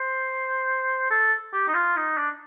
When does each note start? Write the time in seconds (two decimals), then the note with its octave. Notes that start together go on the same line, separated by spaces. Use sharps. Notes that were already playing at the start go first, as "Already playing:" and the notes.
Already playing: C5
1.11 A4
1.53 G4
1.68 D#4
1.74 F4
1.97 D#4
2.17 D4